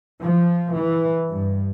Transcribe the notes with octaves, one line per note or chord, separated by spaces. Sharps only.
F3
E3
G2